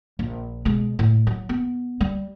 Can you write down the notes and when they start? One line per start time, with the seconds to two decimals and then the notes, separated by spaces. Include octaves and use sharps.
0.19 A#1
0.65 B2 G#3
0.99 A2
1.27 F#3
1.49 B3
2.01 G3